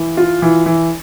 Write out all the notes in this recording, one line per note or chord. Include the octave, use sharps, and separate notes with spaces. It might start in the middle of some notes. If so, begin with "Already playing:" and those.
Already playing: E3
F4
E3
E3